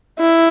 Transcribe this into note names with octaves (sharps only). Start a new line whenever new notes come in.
E4